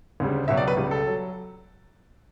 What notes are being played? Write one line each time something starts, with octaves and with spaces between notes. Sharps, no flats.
D2 C#3 G3
C#2 B2 F#3 E5
D5
B4
C#2 C#3 G3
A4
F#3